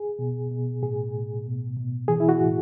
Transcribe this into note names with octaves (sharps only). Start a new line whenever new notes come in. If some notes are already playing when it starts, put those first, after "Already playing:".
Already playing: G#4
B2
B2
A2 G#4
A2
B2
B2
E3 G#4
E4
F#4
A2